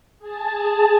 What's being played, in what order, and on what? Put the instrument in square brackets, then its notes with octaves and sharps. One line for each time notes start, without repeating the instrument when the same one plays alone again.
[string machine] G#4 A5